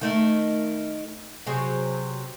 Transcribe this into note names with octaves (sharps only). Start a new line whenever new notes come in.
D#3 A3
C3 F#3 G#4